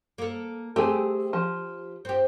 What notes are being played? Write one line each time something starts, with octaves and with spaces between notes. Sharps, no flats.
A#3 A4
A3 C4 G4 G#4
F3
C4 G4